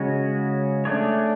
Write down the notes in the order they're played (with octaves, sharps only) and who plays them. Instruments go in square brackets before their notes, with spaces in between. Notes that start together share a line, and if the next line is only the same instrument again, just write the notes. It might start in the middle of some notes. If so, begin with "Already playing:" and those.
Already playing: [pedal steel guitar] C#3 G#3 C#4 F#4
A3 D4 G#4 C#5